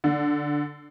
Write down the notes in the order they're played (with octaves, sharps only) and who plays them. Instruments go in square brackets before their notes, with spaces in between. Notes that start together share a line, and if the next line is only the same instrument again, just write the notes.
[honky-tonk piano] D3